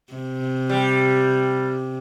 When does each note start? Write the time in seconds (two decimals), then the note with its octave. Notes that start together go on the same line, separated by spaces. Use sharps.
0.13 C3
0.69 G3